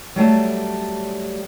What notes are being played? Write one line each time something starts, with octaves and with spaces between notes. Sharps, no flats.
F#3 G3 A3 A5